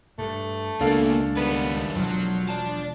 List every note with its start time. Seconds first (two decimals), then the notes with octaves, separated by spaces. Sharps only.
0.18 G2 A3
0.80 C#2 B2 A#3 D4 A4 F5
1.36 D#3 G3 B3
1.96 E1 E2 F3 F#3
2.48 D5 A5